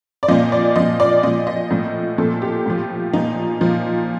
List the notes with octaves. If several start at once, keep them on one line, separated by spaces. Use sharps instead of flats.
D5
A#2 F3 D#5
D5
A#2 F3 D#5
D5
A#2 F3 D#5
D#5
A2 F3
A#2 F3 A4
G4
A2 F3
A#2 F3 D#4
A#2 F3